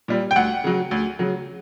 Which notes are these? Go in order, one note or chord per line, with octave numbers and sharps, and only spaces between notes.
A#2 G3
G5
D2 F#5
C#3 F#3
D2
C#3 F#3